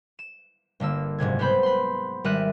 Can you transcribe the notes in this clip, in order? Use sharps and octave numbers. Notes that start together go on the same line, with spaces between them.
E7
G1 D3 A#3 E6
F#1 G#2 C3 G#6
B3 C4 C5 B5 G6
B5 C6
G#1 G3 A#4 E5 F#6 D#7